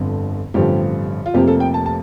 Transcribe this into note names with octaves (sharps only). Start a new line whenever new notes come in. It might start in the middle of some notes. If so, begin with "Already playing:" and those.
Already playing: G1 F2 D3
A1 G2 D3 F3 C4 G4
F4
F1 F2 C3 F3 A#3 G4
A4
G5
A5
A5